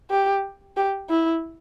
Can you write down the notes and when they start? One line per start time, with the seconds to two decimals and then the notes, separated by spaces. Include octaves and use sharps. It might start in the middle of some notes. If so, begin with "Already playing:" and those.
0.10 G4
0.77 G4
1.10 E4